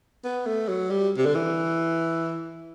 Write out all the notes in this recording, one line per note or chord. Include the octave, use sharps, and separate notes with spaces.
B3
A3
F#3
G3
C3
D3
E3